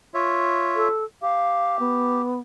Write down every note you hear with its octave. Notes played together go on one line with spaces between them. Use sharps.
F4 C#5 E5
A4
G4 F5
B3